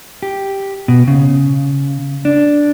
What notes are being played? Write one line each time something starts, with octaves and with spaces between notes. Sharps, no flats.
G4
B2
C#3
D4